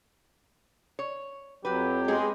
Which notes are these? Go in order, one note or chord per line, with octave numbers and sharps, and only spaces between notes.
C#5
F2 F#3 F#4 G4 B4
G#3 B3 C4 G#4